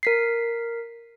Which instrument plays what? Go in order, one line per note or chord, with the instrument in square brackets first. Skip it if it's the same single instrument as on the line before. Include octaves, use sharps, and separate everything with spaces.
[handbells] A#4 B6 C7